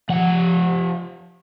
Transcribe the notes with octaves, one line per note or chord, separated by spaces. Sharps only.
F3 F#5